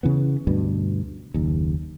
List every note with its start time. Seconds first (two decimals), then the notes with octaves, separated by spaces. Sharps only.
0.03 C#3 E3 B3
0.47 D2 G2 B2
1.34 F#1 D#2